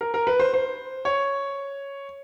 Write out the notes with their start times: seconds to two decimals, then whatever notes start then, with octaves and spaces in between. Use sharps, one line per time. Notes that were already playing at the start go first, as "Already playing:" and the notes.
0.01 A#4
0.14 A#4
0.27 B4
0.40 C5
0.54 C5
1.05 C#5